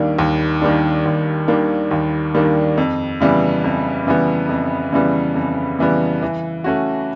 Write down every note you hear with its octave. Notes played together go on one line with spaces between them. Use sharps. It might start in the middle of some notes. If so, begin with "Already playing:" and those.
Already playing: D#2 D#3 G3 A#3 D4
D#2
D#3 G3 A#3 D4
D#2
D#3 G3 A#3 D4
D#2
D#3 G3 A#3 D4
F2
C#3 E3 G3 B3
F2
C#3 E3 G3 B3
F2
C#3 E3 G3 B3
F2
C#3 E3 G3 B3
E3
A3 C#4 F#4